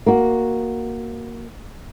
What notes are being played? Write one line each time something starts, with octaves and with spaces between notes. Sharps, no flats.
A#3 F#4